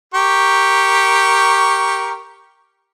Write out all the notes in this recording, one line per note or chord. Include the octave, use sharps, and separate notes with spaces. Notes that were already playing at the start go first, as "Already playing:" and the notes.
G4 A#4 C#6